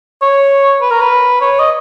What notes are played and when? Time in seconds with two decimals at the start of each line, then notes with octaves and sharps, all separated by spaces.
0.22 C#5
0.82 B4
0.91 A#4
1.01 B4
1.41 C#5
1.59 D#5